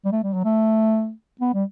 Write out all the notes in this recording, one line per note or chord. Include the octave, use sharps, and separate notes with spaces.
G3
A3
G3
F#3
A3
B3
G3